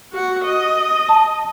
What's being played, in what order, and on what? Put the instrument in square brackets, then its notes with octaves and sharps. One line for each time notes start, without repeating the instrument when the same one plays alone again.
[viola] F#4 F#5
D#5
[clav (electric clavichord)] A5